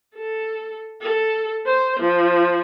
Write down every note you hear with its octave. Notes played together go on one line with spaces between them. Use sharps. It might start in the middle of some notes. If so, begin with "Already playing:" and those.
A4
A4
C5
F3